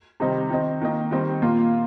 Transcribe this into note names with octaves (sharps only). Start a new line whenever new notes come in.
C3 D#3 G3 C4 D#4
D#3 C4 D#4
D#3 A#3 D#4
D#3 G3 C4 D#4
A#2 A#3 F4